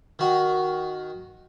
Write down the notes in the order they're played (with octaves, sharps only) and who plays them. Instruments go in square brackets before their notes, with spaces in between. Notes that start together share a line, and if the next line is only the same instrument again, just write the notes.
[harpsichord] D#3 F#4